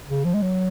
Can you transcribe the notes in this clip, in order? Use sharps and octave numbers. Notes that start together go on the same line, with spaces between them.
C#3
F3
G#3
F#3